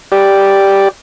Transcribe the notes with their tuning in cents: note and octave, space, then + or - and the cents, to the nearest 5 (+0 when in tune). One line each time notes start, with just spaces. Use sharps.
G4 +0 D5 +0